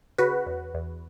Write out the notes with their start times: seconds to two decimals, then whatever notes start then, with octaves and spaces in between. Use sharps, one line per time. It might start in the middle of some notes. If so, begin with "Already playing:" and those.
0.18 C#3 F#4 B4
0.46 E2
0.74 E2